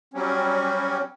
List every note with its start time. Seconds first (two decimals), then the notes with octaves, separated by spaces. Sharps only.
0.14 F#3 G3 C4 C#4